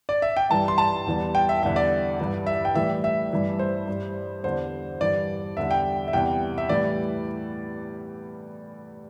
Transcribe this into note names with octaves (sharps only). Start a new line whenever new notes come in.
D5
E5
G5
G2 E3 G3 A5
C6
A5
E2 E3 G3
G5
E5
E2 D3 G3 E5
D5
G2 E3 G3
E5
G5
A2 E3 G3 E5
E5
G2 E3 G3
C5
G2 G3
E2 D3 G3 C5
G2 E3 G3 D5
E2 D3 G3 E5
G5
E5
E2 C3 G3 G5
E5
A2 E3 G3 D5